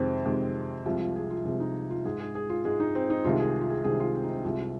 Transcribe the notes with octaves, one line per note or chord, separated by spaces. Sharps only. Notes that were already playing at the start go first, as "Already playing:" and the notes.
Already playing: F2 C3 D#3 G#3 C4
F2 C3 D#3 G#3
C2 C3 F3 G#3 F4
F4
G#4
F4
C2 C3 F3 G#3 F4
D#4
F4
G#2 G#3 G#4
G#4
G#4
F4
G#2 G#3 G#4
D#4
C4
D#4
C2 C3 D#3 G#3 F4
G#4
F4
G#4
C2 C3 D#3 G#3 G#4
F4
C4
D#4
C4
C2 C3 G#3 F4
F4